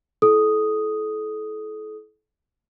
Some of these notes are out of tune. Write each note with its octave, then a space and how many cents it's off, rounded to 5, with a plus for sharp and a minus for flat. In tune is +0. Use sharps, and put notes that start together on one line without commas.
E4 +0 A4 -35 D#6 +0